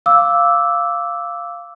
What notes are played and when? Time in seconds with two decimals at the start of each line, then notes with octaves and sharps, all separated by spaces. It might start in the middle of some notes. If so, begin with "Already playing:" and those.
0.06 F5 D6 E6